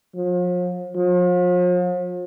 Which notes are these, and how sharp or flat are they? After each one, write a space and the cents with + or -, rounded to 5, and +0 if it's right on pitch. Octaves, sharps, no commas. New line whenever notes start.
F3 +40
F3 +40